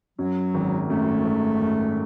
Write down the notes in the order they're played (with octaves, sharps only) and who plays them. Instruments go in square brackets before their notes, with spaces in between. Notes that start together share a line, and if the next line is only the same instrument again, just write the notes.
[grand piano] F#2 [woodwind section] F#3
[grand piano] G#1
[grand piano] F#2 [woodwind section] A3
[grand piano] G#1
F#2